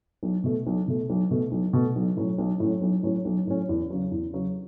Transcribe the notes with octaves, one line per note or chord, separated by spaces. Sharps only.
B1
B2 A3
B1
B2 A3
B1
B2 A3
B1
B2 A3
B1
A2 F#3 C#4
B1
A2 F#3 C#4
B1
A2 F#3 C#4
B1
A2 F#3 C#4
E2
C#3 F#3
E2
C#3 F#3